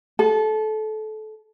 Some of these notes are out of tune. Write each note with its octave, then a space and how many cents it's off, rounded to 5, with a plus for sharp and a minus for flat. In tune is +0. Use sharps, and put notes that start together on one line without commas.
A4 -25